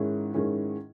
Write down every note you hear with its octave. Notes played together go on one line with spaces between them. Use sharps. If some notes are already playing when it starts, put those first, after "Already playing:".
Already playing: G#2 D#3 G#3 C#4 E4
G#2 D#3 G#3 C#4 E4